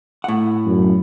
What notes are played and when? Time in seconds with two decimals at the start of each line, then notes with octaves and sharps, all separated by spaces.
0.24 A2 F#5
0.66 F#2